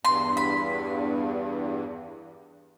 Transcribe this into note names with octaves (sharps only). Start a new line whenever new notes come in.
E2 G2 C6
B5